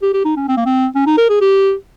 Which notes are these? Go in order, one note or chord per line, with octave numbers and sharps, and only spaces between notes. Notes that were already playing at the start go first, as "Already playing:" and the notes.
G4
G4
D#4
C#4
C4
A#3
C4
C#4
D#4
A#4
G#4
G4